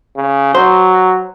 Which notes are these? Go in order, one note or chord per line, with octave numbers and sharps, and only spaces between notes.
C#3
F#3 C5